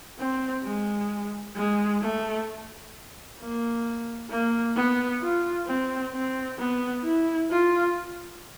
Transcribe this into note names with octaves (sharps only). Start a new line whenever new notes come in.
C4
G#3
G#3
A3
A#3
A#3
B3
F4
C4
C4
B3
E4
F4